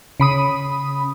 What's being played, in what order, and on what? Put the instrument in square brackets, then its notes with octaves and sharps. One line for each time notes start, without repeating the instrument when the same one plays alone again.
[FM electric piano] C#3 B5 D#6